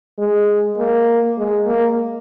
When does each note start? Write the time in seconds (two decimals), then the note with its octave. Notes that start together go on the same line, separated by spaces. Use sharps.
0.18 G#3
0.78 A#3
1.38 G#3
1.67 A#3